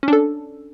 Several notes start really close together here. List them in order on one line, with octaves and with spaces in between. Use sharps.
C#4 D4 A4